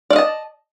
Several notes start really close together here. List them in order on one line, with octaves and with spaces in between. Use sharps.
D5 F5 D#5 A5